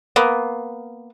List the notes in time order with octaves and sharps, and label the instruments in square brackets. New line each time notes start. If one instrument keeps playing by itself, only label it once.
[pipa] A#3 B3